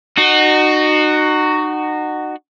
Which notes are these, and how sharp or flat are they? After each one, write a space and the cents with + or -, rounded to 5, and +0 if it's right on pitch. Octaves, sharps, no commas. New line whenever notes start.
D#4 -30 F#4 +10